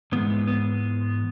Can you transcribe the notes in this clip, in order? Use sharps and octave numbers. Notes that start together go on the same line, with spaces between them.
G#2 E3 G#3 B3
B3
B3